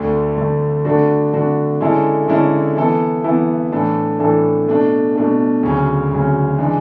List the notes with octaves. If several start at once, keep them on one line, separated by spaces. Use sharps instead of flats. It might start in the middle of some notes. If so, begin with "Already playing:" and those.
Already playing: D2 D3 A3
D2 D3 A3
D3 A3 D4 F#4
D3 A3 D4 F#4
D3 G#3 C#4 E4 A4
D3 G#3 C#4 E4 A4
E3 B3 E4 A4
E3 B3 E4 A4
A2 E3 A3 D4 A4
A2 E3 A3 D4 A4
B2 A3 D4
B2 A3 D4
D2 C#3 F#3 C#4
D2 C#3 F#3 C#4
E3 G#3 D4